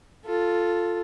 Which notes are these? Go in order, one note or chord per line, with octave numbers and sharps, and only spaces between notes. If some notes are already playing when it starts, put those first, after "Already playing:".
F4 A4